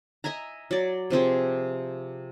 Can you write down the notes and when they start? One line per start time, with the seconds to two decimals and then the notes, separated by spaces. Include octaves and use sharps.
0.24 D#5 E5 G#5 A#5
0.71 F#3 D5
1.10 C3 F3 C4 G#4